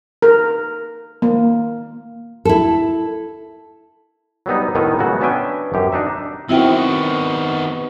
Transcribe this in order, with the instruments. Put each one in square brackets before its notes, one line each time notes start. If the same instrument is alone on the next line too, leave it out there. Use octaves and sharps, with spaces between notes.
[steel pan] A#4
A#3
[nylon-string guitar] E4 A4
[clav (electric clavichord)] F#3 G3 B3 D#4
A2 D#3 B3 D#4 E4
C#3 F#3 G#3 A#3 B3 F#4
B3 C#4 D4 E5 G5 G#5
F#2 G4
D4 D#4 E5
[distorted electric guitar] D#3 B3 [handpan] C4 F#4 [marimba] E4 E5 G5